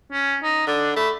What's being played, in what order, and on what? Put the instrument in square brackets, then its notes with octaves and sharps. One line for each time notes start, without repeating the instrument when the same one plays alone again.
[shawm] C#4
D#4
[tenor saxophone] D3 [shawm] D4
[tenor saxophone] A3 [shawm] B5